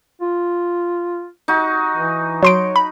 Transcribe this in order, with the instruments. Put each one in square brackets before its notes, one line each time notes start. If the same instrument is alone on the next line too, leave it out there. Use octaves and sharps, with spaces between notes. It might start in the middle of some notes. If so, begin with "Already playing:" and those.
[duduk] F4
[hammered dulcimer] D#4 F#4
[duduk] E3
[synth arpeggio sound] F#3 C6 D7 [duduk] C#5
[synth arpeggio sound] B5